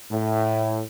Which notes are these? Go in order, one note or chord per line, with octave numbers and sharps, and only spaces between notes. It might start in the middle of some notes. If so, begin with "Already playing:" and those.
A2